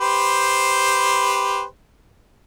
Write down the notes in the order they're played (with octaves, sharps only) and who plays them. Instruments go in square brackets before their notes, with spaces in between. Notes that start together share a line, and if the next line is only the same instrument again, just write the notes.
[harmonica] G4 B4 C5